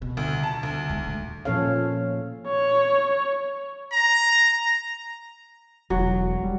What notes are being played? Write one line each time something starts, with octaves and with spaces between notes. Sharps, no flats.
B2
D2
A5
D2
D#2 G#3
A#2 A3
A#2 F3 C#4 A4 C#5 F5
C#5
A#5
E1 F#3
G3